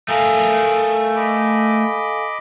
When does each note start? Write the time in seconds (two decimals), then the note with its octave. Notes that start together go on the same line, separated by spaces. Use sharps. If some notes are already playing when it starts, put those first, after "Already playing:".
0.08 A3 A4 A#4 F5 G#5 D#6
1.16 D#5 B5 D6